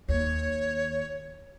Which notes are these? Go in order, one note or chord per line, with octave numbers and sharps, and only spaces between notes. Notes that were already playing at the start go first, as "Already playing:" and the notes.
D#2 C#5